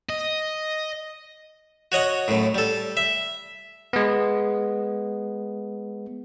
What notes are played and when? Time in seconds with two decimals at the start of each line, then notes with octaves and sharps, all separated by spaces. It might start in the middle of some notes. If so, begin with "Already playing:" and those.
0.10 D#5
1.92 F#4 C#5 D#5 F#5
2.28 F#2 A2
2.55 G3 A4
2.97 E5
3.93 G#3 B3